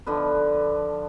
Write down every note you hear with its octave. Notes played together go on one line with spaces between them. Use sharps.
D3 F3 B4